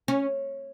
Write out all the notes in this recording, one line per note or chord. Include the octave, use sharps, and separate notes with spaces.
C#4